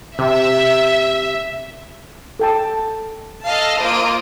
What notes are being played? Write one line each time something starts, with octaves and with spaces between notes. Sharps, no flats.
C3 E5
A4 G5 A5
A4 D#5 F5 A5
A#3 F4 C5 D#6 D7